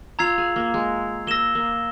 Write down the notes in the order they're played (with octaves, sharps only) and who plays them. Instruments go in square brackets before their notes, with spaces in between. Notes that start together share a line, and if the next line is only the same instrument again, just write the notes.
[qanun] F4 [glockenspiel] A#5 E6 G#6 C7 F7
[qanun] G#4
A#3
G#3
[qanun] A#3 [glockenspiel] E6 A#6 E7 G7
[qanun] A#3